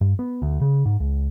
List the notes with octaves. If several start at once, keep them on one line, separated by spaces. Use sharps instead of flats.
G2
B3
D2
C#3
G#2
C#2